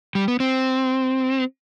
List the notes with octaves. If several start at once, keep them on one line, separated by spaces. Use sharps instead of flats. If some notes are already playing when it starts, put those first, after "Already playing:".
G3
B3
C4